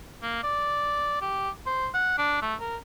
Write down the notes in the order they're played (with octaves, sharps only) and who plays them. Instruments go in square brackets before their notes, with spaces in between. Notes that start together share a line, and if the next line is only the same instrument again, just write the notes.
[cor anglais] A#3
D5
G4
C5
F#5
D4
A3
A#4